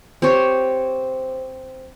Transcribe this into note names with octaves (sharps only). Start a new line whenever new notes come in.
C4 G4 C5 C#5